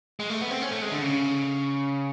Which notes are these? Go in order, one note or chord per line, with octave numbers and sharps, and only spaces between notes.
G#3
A3
B3
C4
C#4
A3
G#3
D3
C#3